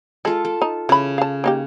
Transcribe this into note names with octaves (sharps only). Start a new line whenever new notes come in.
G#3 F4 A4
A4
D#4
C#3 E3 B5
F5 A5
A#3 D#4 G4